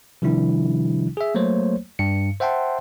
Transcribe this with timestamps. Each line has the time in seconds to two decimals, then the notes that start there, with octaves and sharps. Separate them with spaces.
0.22 C3 D#3 F3 G3 D4 E4
1.17 G#4 E5
1.35 F#3 A3 A#3 C5 C#5
1.99 G2 C#7
2.40 C5 E5 F#5 G5 A5 C6